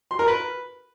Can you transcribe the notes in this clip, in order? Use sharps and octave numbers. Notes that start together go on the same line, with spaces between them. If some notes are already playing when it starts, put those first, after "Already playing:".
C6
A#4
B4